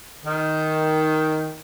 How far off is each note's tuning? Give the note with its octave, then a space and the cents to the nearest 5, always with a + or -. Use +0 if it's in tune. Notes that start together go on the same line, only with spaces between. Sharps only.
D#3 +5